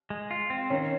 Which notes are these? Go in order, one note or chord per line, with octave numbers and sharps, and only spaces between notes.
G#3
F4
C4
D#3 C#4